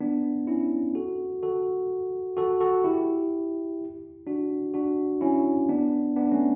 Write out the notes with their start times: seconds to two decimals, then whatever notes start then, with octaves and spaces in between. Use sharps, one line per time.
0.01 B3 D4
0.47 C#4 E4
0.95 F#4 A4
1.43 F#4 A4
2.37 F#4 A4
2.61 F#4 A4
2.84 E4 G4
4.27 D4 F#4
4.74 D4 F#4
5.21 C#4 E4
5.69 B3 D4
6.16 B3 D4
6.31 A3 C#4